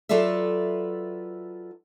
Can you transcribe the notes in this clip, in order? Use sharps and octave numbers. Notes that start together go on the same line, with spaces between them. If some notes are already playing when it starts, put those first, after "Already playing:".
F#3 F4 A4 B4 D5 E5